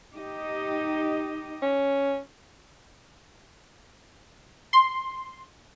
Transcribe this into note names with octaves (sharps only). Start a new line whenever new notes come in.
D#4 G4 D#5
C#4
C6